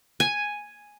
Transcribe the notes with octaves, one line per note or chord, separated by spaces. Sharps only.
G#5